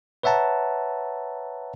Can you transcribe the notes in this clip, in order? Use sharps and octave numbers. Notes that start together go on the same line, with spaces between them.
B4 C#5 E5 F#5 A5 A#5